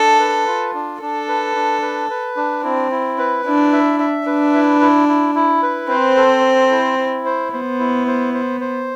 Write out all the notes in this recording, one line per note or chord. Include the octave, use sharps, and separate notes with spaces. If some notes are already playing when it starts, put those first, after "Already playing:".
Already playing: D4 A4
B4
F4
D4
D4 A4
B4
D4
B4
B4
D4
C4 E4
E4
B4
D4 E4
E5
E5
D4 B4
E4
E4
E4
E4
B4
C4 C5
A4
C5
E4
E4
C5
B3 C5
E4
C5
C5
C5